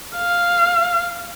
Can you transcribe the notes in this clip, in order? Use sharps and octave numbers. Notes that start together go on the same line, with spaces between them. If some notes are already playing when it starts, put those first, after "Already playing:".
F5